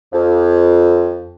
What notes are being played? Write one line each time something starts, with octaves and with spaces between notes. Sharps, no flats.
F2